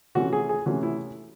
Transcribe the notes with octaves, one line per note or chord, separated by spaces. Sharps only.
C3 E3 A3 C#4 F#4
G#4
G#4
C3 E3 A3 C#4 F#4
E4